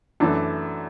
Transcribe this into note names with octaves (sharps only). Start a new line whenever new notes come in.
F#2 E3 A3 D4